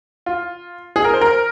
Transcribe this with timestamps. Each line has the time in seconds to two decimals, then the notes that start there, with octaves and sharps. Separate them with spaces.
0.26 F4
0.96 G#4
1.05 A#4
1.14 C5
1.21 A#4